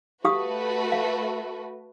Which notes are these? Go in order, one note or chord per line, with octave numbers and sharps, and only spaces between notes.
A3 F#4 G4 B4 F5 D#6
F5